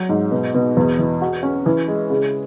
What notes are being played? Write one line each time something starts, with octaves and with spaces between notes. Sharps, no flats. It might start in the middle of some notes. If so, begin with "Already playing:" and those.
Already playing: F#3
G#2
B2
B2
E2
E3
F#4
C#4
E3
G#3
C#3